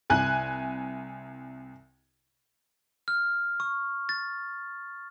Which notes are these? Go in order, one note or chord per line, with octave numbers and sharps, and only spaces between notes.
C2 G#5 F#6
F6
C#6
A6